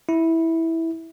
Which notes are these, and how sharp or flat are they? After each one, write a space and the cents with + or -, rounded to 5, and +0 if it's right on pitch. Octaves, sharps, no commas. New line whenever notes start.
E4 -10